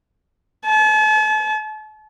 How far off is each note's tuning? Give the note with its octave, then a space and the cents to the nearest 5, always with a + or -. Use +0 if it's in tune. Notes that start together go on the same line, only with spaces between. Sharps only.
A5 -40